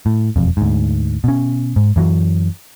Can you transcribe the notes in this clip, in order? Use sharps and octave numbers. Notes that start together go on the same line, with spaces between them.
A2
E1 F2
D2 G#2
B2 C#4
G#2
F#2 E3 F#3